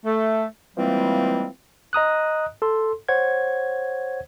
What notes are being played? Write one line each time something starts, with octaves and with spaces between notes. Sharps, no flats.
A3
E3 F3 G3 G#3 A#3 C4
D#5 A#5 D#6 F#6
A4 C6
C5 C#5 F#5 G#6